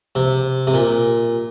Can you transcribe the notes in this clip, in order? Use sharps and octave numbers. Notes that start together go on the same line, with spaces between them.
C3
C3
A#2